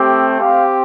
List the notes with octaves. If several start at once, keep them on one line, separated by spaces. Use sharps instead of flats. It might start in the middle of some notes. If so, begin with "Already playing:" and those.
Already playing: A3 C4 G4
C4 G4 F5